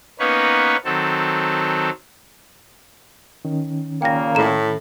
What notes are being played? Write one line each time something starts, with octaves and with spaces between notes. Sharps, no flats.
A#3 B3 C#4 D#4 B4 C#5
D#3 F#3 C4 A4
D#3 C#4
A#2 C#3 A#3 G5 A#6
A2 A#5 E7